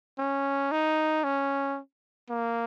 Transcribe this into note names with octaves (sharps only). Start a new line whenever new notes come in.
C#4
D#4
C#4
A#3